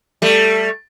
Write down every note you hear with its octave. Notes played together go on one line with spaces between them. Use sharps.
G3 A3